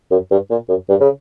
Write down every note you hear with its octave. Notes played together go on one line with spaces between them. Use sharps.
F#2
G2
A#2
F#2
G2
C#3